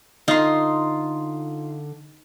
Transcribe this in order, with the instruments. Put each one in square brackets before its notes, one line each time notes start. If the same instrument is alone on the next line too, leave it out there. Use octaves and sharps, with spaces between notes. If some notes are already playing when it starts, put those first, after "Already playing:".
[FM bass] D3 [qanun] D#4 [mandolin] F4 C6